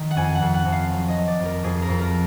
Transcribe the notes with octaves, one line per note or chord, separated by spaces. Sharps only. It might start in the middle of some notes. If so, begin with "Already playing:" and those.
Already playing: D#3
F#5
F2 G#5
F#5
F2
F#5
F2
F5
F#3
D#5
F#3
D5
F2
A#4
F2 G#4
A#4
F2
A#4